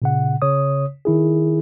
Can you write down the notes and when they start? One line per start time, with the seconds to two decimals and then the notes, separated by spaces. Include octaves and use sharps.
0.02 A#2 C#3 F#5
0.42 C#3 C#5 D#6
1.05 D#3 E4 G#4